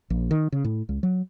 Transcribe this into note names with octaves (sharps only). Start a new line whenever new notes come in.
A#1
D#3
C#3
A2
C#2
F#3